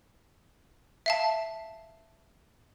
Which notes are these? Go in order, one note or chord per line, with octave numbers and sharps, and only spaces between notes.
E5 F5 A5